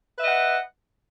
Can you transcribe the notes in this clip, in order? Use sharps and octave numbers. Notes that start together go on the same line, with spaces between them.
B4 D#5 E5 F#5